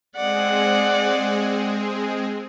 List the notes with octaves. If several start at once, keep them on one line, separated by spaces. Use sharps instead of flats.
G#3 C4 G#4 D5 F#5